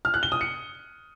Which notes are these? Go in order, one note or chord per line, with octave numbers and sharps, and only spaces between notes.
F6
F#6
G7
D#6
C#7